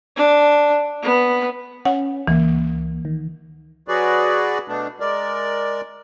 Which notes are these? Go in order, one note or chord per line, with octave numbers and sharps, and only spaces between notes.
D4
B3
C#4 F#5
C#2 E3 A#3
D#3
F#3 F#4 G#4 B4 D5
B2 A3 B3 D4
G#3 A#4 D5